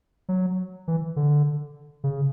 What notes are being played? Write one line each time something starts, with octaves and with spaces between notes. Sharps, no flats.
F#3
E3
D3
C#3